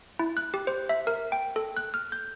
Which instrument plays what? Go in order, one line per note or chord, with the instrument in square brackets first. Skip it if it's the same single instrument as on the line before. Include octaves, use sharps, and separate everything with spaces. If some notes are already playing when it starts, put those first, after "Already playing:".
[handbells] E4
F#6
G4
C5
E5
A#4
G5
A4
F#6
F6
G6